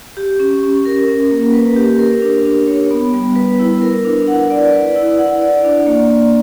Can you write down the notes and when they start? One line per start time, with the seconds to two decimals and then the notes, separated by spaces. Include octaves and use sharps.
0.17 G4
0.40 C#4
0.63 C#4
0.85 A#4
1.08 C#4
1.31 A#3
1.54 B4
1.76 G4
1.99 A#4
2.22 D4
2.45 D4
2.67 C#5
2.91 B3
3.14 G3
3.36 B4
3.59 E4
3.82 A#4
4.05 D4
4.27 F#5
4.50 D5
4.73 B4
4.96 E4
5.19 F#5
5.42 D5
5.65 D4
5.87 A#3
6.10 A#3